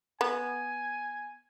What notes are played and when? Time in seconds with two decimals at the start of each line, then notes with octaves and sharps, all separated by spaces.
0.21 B3 G#5